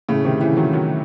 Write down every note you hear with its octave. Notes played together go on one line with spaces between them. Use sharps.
A2 C#3
C3 D#3
C#3 E3
D#3 F#3
D#3 F#3